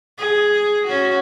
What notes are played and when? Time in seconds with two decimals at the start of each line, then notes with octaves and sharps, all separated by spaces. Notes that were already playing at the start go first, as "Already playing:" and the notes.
0.18 G#4
0.86 C#4 F#4